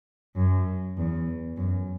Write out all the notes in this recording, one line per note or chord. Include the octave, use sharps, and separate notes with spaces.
F#2
E2
F#2